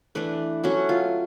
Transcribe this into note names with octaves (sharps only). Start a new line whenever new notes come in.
E3 A3 D4 B4
F#3 A3 C#4 F#4
F4